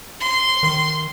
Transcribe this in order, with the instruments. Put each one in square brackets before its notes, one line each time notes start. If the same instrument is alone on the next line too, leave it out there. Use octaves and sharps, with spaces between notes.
[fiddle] C6
[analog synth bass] D#3